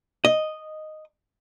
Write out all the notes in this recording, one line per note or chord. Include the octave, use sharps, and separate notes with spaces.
D#5